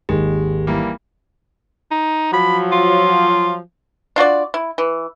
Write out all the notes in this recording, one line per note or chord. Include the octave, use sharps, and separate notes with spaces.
G#1 D#2 G#3 G4
E3 G3 A#3
D#4
F3 F#3 B5
F4
D4 F4 F#4 D5
E4
E3